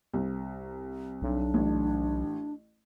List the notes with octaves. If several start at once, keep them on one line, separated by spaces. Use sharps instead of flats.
C2
B1 D4
A1